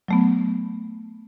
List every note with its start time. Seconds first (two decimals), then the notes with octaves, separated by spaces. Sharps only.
0.08 F#3 A3 B3